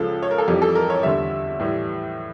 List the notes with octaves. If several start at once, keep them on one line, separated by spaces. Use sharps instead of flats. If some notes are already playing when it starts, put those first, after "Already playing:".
Already playing: C#2 C#3 F3 A4
C#5
A#4
A4
F2 E3 G3 G4
A4
A#4
C#5
E2 D3 G3 E5
A2 E3 G3